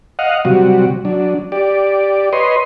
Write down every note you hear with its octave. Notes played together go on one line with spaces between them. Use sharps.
D#5 F5 F#5
C3 F#3 G3 F#4
F#3 D4
G4 D5
B4 C#5 D#5 C6